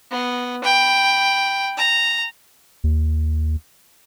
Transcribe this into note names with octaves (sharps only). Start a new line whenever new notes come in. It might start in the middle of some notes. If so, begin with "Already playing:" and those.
B3
G5 B5
A#5
D#2